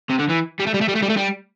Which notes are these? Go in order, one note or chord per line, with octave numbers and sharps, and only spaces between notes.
C3
D3
E3
G3
A3
G3
A3
G3
A3
G3
A3
G3